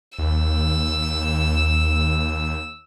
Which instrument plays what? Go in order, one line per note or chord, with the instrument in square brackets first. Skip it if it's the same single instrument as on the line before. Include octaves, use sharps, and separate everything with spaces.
[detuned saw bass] D#2 [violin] E6